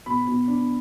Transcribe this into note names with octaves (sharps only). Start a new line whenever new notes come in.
B2 B5
B2
D4